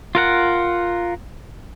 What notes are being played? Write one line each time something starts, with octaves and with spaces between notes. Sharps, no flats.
F4 A#4 F#5